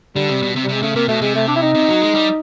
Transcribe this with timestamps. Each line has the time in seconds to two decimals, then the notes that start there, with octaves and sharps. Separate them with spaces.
0.15 D3 G3
0.29 C3
0.42 B2
0.56 C3
0.63 G3
0.69 C3 G#3
0.82 C#3 A3
0.95 C3 A#3
1.08 B2 A3
1.21 C3 G#3
1.35 A3
1.48 D4
1.56 E4
1.62 D#4
1.75 C3
1.88 F#3
2.01 G#3
2.15 G3